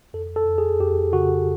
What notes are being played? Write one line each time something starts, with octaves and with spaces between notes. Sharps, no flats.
F2 A4
A4
F2
G#4
F2 G4
C#3 F#4